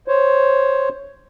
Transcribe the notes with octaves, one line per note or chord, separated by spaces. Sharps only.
C5 C#5